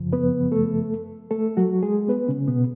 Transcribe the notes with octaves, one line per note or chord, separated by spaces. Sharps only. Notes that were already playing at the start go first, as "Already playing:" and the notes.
Already playing: F#2 C#3 F3
B3 B4
A3 A4
A3 A4
F#3 F#4
G#3 G#4
B3 B4
C#3 C#4
B2 B3